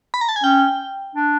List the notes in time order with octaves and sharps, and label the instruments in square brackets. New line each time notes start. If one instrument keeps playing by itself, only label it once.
[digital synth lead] B5
A#5
A5
G#5
[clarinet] C#4 [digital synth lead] G5
[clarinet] D4